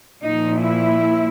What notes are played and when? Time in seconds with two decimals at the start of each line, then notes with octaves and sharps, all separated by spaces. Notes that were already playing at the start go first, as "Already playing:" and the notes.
0.22 A#2 F3 D#4
0.59 E4